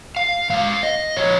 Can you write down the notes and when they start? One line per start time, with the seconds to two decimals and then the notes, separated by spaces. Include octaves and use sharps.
0.17 F5
0.50 A#2 G#3 F5
0.83 D#5
1.17 A#2 F3 C#5